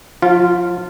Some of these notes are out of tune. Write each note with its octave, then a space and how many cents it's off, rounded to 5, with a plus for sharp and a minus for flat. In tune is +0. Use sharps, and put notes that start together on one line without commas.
F3 +40 F4 -10